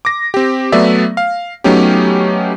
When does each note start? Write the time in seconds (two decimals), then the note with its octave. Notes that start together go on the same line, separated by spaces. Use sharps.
0.05 D6 A#6
0.34 C4 G4
0.72 F#3 A3 B3 D5 E5
1.17 F5
1.64 F#3 A3 B3 C#4 D#4 G4